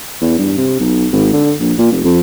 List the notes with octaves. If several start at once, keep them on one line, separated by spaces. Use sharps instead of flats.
E2
G2
C3
B1
G#1
D3
A#1
A#2
F1
F2